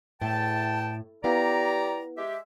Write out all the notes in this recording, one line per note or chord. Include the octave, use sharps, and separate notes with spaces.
E2 A2 G5 A5
B3 E4 G4 D5 F5 A#5
G#3 G4 E5